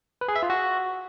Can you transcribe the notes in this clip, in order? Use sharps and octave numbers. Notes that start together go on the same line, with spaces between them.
B4
G#4
E5
F4
F#4